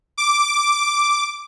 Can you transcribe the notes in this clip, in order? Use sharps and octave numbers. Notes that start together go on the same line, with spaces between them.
D6